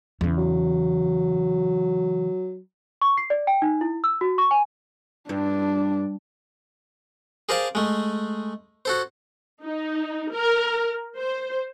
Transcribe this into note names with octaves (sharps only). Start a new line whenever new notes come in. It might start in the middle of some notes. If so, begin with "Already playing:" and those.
E2 C#3
F#3
C#6
C7
D5
G5
D#4
E4
E6
F#4
C#6
G#5
G2 D4
G#4 A#4 C5 D5 F5 A5
G#3 A3
F#4 A4 C5
D#4
A#4
C5